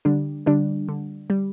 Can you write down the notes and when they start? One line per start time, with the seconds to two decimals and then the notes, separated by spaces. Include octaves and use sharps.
0.05 D3 G3 D4
0.46 D3 G3 D4
0.89 D3
1.30 G3